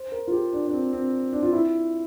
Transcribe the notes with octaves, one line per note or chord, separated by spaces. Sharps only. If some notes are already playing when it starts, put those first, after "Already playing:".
Already playing: C5
A#4
F4
G4
D4
D4
C4
C4
D4
F4
E4